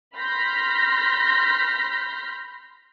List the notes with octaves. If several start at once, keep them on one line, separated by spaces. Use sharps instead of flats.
B5 C6 F6 G6 A#6 B6